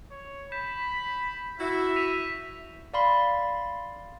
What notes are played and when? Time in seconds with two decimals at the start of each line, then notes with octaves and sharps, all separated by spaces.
0.11 C#5
0.52 B5 G6 B6 E7
1.60 E4 F#4 E5
1.96 B6 D#7 F7
2.94 D5 F5 B5 C6